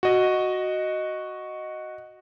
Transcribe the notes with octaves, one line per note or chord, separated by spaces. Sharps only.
F#4 D#5